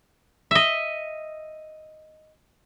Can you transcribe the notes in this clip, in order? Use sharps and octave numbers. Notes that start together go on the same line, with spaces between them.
D#5 E5